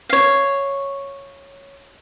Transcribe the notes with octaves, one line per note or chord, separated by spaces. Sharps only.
C#5 F5